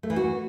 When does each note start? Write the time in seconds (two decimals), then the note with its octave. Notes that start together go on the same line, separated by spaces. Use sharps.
0.03 A3
0.10 E3
0.16 F#4